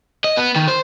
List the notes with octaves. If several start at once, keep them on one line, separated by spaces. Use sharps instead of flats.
D#5
B3
D#3
C5